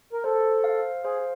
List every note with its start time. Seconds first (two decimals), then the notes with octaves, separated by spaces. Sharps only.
0.12 A#4
0.24 A4 C5
0.64 F5
1.04 G#4 C5